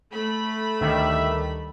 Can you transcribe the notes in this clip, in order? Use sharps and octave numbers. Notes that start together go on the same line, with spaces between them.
A3 B5
D2 D#3 G3 E5